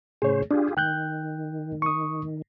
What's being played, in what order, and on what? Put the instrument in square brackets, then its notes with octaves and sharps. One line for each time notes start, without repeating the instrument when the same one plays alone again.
[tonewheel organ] A2 C#3 C5 [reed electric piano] G#4 C#5
[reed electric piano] D4 [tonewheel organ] F4 G4 G#4
[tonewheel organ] D#3 [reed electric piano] G5 F#6 G6
[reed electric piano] C#6 D#6